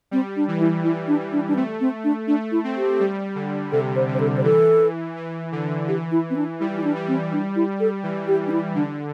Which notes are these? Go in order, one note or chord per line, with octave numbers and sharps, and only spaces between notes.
G3 C4
D4
E3
E4
E3 E4
D4
E3
D4
D4
A3 C4
C4
D4
A3 D4
E4
C4
G4
G3
D3
C3 A4
C5
D3
C5
A4
C5
E3 A4
E3
D3
E3 G4
E4
C4
D4
G3 E4
E4
D4
G3
C4
D4
E4
A4
E3
G4
D4
E4
D3 D4